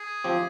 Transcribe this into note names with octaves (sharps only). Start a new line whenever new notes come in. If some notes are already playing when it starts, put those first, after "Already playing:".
Already playing: G#4
F3 C4 G4